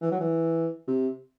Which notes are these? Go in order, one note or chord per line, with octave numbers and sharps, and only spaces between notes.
E3
F#3
E3
C3